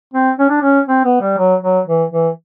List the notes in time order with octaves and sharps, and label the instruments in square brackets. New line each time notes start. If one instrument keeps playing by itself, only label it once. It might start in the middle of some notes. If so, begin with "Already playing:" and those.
[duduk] C4
C#4
D4
C#4
C4
B3
G3
F#3
F#3
E3
E3